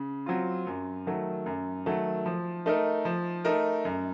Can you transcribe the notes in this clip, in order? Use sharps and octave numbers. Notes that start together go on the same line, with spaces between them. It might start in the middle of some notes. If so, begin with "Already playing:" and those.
Already playing: C#3
F#3 C4 F4
F#2
D#3 F#3 A3
F#2
D#3 F#3 A3
F3
A3 D#4 A#4
F3
A3 D#4 A#4
F#2